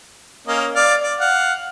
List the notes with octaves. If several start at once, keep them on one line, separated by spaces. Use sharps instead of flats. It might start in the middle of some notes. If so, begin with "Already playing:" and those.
A#3 C#4 D#5
D5 F5
D5
F5 F#5